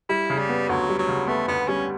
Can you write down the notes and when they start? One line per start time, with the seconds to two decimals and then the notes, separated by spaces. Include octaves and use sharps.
0.09 G3 E4
0.30 C#3
0.39 G3
0.49 B3
0.69 D2 F#3
0.89 G3
0.99 F#3
1.08 C#3
1.28 A3 B3
1.48 D2 B3
1.68 G3 C#4